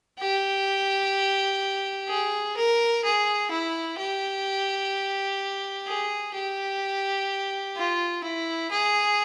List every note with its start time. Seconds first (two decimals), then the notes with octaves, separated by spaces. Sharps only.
0.19 G4
2.08 G#4
2.57 A#4
3.04 G#4
3.51 E4
3.99 G4
5.87 G#4
6.35 G4
7.76 F4
8.23 E4
8.71 G#4